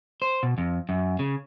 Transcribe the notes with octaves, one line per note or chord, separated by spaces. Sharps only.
C5
B2
F2
F#2
C#3